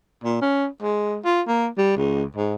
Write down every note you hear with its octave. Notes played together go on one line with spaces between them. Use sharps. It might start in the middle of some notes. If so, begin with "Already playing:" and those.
A#2
C#4
G#3
F4
A#3
G3
C#2
G#2